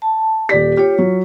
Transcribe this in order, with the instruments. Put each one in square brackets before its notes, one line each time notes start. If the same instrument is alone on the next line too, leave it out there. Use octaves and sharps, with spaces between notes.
[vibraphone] A5
[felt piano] D#1 D5 B6 [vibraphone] G4
[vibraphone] F4 C#5 [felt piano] G4
[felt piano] F#3